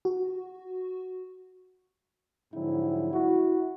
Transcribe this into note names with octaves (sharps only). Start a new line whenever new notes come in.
F#4
G#2 D3 F3 F#3 C4 E4
E4 F#4